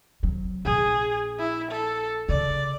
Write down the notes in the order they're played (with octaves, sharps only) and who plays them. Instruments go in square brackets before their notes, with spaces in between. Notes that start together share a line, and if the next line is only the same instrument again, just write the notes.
[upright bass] F#3 C4
[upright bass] A#1 [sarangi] G#4
[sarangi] E4
A4
[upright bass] C#3 [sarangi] D5